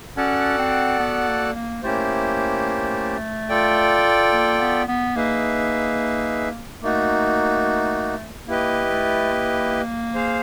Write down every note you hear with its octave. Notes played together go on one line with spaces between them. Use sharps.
C#4 F#4 A4 D5 F#5 A5
C4
B3
A#3
A#3
A3 A#3 C#4 E4 G4 C5
F4 A4 D5 G5
A#3
B3
B3
A#3 D#4 G#4 B4 E5
A3 A#3 D#4 F#4
A#3 E4 G4 B4 D#5
A3
A#3
G#4 C5 F5